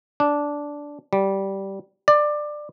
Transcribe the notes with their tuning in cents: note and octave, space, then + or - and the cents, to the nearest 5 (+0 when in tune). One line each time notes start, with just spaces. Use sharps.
D4 -10
G3 -10
D5 +15